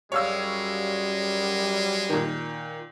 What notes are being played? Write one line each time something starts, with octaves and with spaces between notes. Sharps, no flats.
F#2 G3 G#3 C#5 F5 E6
A#2 D#3